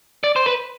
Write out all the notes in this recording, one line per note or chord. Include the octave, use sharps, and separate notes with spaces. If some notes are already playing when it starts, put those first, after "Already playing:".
D5
C5
B4